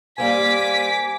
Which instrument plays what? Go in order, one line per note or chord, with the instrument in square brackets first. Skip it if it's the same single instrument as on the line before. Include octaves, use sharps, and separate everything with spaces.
[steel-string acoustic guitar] G3 A#3 C4 [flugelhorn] G#5 [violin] D6 B6